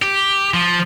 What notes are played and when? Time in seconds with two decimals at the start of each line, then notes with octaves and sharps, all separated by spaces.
0.02 G4
0.54 F3